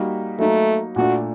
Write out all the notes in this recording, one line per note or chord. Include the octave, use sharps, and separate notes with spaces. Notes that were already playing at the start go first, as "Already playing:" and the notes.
Already playing: G3 A#3 D#4 F#4
F#3 A3 A#3 D#4
A#2 A3 D4 F#4